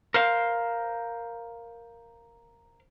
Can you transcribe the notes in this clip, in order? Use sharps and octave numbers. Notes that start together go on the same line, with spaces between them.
A#4 C5 F5